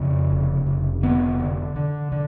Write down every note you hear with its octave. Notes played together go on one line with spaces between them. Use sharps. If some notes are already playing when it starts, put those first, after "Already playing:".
Already playing: F2 C#3
F1
F1
D3 B3
D3
D3
D3